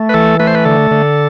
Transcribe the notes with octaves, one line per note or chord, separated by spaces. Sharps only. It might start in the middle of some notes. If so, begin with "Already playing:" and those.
Already playing: A3
B4
E3 A4
A3 B4
C5
B4
D3 A4
D3